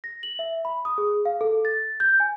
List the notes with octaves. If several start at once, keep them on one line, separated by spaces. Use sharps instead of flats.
A#6
F#7
E5
B5
D#6
G#4
F5
A4
A6
G6
G#5